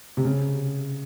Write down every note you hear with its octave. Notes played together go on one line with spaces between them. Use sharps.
C3
C#3